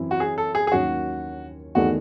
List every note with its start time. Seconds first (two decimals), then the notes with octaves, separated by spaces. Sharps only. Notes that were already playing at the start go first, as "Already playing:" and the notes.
Already playing: F#2 E3 C4 E4
0.11 F#4
0.20 G#4
0.38 A4
0.55 G#4
0.67 G#4
0.72 D#2 D#3 F#3 C#4 F#4
1.75 E2 D#3 A3 D#4 F#4 G#4